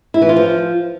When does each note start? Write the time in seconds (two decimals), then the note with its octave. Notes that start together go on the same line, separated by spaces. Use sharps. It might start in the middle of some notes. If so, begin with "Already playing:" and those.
0.14 E4
0.22 E3
0.29 F4
0.37 F3